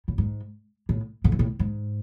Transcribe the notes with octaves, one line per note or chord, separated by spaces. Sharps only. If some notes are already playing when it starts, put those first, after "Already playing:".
A2
G#2
A2
A2
G#2
A2
G#2